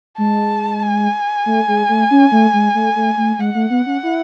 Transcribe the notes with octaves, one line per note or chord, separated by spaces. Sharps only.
G#3 A5
G#5
A3
G#3
A3
C#4
A3
G#3
A3
A3
A3
G#3 F#5
A3
B3
C#4
E4